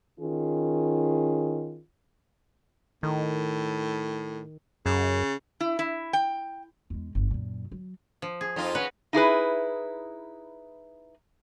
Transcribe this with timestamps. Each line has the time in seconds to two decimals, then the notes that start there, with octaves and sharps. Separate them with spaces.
0.19 D#3 C#4 F4 G#4
3.03 A2 D#3
4.86 F#2 C#3
5.60 E4
5.79 E4
6.13 G5
6.90 E2 G#3
7.15 G1 F2
7.31 F#2 A#2
7.72 F#3
8.22 F3
8.41 G#4
8.56 F2 D#4 F4
8.75 C#4 F#4 B4
9.13 D#4 E4 G#4 B4